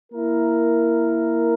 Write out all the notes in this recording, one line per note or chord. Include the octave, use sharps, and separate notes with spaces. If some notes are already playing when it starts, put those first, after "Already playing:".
A#3 E4 A#4